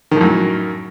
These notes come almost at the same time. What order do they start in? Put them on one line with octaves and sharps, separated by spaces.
D#3 A2 F#2